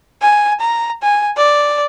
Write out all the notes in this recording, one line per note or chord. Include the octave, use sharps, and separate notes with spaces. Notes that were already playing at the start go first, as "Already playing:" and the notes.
G#5
A#5
G#5
D5